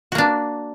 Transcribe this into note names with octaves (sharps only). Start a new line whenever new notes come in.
A#3 D4 F#4